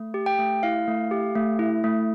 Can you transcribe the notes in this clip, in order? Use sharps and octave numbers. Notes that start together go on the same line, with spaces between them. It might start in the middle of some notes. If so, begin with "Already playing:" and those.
Already playing: A3
G4
G5
A3
E4 F5
A3
G4
A3
E4
A3